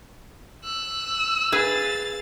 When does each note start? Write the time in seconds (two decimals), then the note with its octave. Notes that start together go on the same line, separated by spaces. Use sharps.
0.64 E6 F#6
1.52 G#4 B4 F5 A6